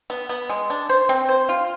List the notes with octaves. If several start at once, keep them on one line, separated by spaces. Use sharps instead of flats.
B3
B3
G#3
D4
C5
C4
C5
F4